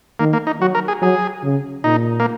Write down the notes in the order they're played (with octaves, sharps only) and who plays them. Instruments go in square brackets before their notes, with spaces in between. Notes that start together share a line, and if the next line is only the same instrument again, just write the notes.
[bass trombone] D#3 [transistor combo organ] A#3
[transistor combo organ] A#3
D#4
[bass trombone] F#3 [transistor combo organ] F#4
[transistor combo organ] A#4
G#4
[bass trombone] F#3 [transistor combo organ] G#4
[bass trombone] C#3
[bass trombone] A#2 [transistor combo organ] D#4
[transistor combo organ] A#3